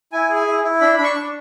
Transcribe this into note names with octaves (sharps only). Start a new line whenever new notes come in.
E4 G#5
G#4
G#5
E4
E4
D4 B5
D4 B5
C#6
D4